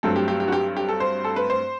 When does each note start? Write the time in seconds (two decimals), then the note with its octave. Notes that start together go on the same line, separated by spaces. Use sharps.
0.03 G2 F#3 A3 C4 A4
0.16 G4
0.28 G4
0.40 G4
0.48 F#4
0.52 G4
0.77 G4
0.89 A4
1.00 C5
1.25 A4
1.36 B4
1.50 C5